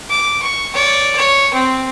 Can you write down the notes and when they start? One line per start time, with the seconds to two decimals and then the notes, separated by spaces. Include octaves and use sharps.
0.10 D6
0.43 C#6
0.74 C#5 D5
1.17 C#5
1.54 C4